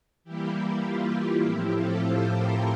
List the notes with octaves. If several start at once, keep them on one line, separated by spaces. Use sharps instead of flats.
E3 G3 A#3 E4 G4
F4
A2 F3 C4 E4 G4
F4 A4
A4 C5
G4 A#4